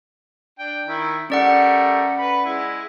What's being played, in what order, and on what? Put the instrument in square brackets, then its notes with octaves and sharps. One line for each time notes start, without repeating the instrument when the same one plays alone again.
[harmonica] D4 G5
D#3 E4
[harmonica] G3 A3 A#4 [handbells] C#4 D5 F#5
[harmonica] B4 B5
G#3 E4